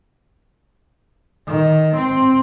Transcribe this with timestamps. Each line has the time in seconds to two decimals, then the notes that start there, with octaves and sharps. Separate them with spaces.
1.48 D#3
1.96 C4